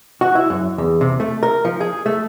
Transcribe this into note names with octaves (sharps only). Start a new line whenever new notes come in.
F#4
E4
F#2
E2
C3
A3
A#4
F3
G#4
A3